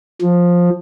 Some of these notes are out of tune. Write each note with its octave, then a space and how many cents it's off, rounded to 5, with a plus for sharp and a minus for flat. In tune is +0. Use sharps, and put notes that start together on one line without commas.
F3 +10